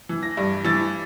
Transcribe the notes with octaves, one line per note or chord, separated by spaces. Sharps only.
E3
A#6
G2
E3 A6